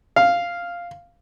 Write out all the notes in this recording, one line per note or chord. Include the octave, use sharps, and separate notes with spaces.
F5